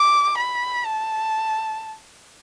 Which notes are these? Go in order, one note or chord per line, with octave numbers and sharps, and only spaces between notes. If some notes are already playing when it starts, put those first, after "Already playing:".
Already playing: D6
B5
A5